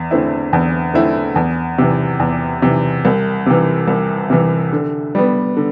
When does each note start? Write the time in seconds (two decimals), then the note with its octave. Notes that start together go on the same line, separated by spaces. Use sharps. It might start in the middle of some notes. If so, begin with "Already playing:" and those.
Already playing: E2
0.11 D3 A3 C4 E4
0.53 E2
0.94 D3 A3 C4 E4
1.36 E2
1.78 C3 E3
2.20 E2
2.62 C3 E3
3.05 C2
3.46 C3 E3
3.88 C2
4.30 C3 E3
4.73 D3
5.15 G3 B3
5.57 D3